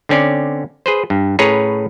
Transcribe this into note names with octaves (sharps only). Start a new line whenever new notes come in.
D3 C4 C#4 D5
G#4 B4 C5
G2
A2 C#4 G#4 B4 C#5 A#5